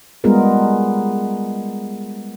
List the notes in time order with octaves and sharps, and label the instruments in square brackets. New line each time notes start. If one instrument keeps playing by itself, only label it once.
[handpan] G3 G#3 B3 F4 G#4 A#4